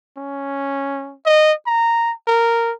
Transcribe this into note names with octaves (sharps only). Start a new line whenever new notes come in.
C#4
D#5
A#5
A#4